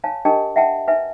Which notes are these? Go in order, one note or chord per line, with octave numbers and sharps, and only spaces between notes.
C#5 F5 G#5 A5
D4 G4 A#4 D#5 G5 A5
E5 F#5 G5 A5
B4 E5 G#5